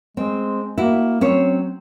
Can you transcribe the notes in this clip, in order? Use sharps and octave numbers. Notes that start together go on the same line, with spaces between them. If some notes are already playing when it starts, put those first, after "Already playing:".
G#3 C4
A#3 E4 F#4
F#3 C4 C#4 C#5